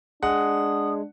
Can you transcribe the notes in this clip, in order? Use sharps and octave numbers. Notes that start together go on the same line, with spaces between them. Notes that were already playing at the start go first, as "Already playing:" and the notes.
G#3 D4 F#5 D#6